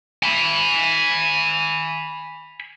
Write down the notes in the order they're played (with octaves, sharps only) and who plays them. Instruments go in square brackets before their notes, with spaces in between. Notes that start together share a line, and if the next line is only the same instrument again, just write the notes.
[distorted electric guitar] G#5 B5